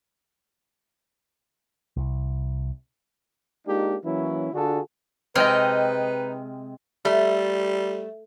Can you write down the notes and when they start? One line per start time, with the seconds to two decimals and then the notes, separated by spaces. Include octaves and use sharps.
1.97 C2
3.67 G#3 A#3 D4 D#4 F4 G4
4.05 E3 F#3 A#3 C#4 E4
4.54 D3 D4 F4 F#4 G#4 A4
5.36 C3 G#3 D#4 B4 D#5 G5 F6
7.05 G3 A3